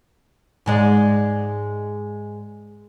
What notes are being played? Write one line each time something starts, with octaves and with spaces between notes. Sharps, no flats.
G#2 G#3 D5